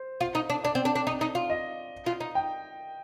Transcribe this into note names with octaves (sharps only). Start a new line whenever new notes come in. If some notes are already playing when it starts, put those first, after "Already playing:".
Already playing: C5
F4
D#4
D4
D4 D5
C4
D4
D4
D#4
D#4
F4
D#5
F4
D#4
G5